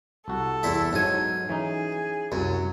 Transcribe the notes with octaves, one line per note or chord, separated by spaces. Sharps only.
C2 F#4 A4
E2 E5
B1 G#2 F#3 G#5
E3 C#4 D#4 G#4
C2 F#2 F#3 G#5